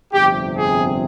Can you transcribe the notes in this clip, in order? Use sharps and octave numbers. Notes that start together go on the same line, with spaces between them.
G1 F2 C3 G4
G#4